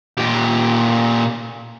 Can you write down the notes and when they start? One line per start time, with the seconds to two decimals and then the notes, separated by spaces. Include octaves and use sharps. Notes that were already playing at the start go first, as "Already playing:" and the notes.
0.18 A#2 G4